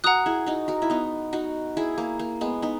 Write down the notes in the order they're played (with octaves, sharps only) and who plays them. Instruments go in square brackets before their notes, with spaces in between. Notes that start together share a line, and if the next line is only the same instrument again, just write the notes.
[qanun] F#4 A#4 [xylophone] F#5 A#5 D#6 F#6
[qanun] E4 G#4
D#4 F#4
F#4 A#4
E4
B3 D#4
D#4 F#4
E4 G#4
A#3
A#3
G#3 B3
B3 D#4